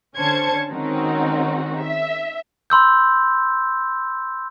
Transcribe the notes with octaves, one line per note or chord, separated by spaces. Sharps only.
D3 C#4 C5 A5 G#6 C#7
D#3 G#3 C4 C#4 D#4 F#4
E5
B5 C6 E6 G6